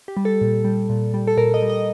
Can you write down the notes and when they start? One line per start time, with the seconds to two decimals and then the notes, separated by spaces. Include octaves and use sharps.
0.08 G4
0.17 G3
0.25 A4
0.41 A#2
0.65 G3
0.89 A#2
1.14 G3
1.27 A4
1.37 A#2 A#4
1.54 D#5
1.62 G3
1.70 D#5